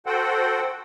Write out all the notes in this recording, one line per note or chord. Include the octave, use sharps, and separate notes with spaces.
F#4 A4 C5 F#5 G5